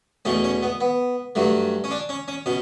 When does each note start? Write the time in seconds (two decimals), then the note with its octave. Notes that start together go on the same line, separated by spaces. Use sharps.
0.25 E2 B2 A3 C#4
0.44 C#4
0.63 B3
0.81 B3
1.35 G2 F#3 A3
1.84 C#4
1.91 D4
2.09 C#4
2.28 C#4
2.46 B2 C#4